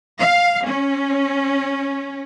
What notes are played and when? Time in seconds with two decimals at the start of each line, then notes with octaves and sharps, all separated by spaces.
0.18 F5
0.64 C#4